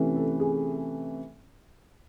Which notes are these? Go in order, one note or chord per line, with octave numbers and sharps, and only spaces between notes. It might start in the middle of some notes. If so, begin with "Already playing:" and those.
Already playing: C3 E3 A3 C#4
A4
G#4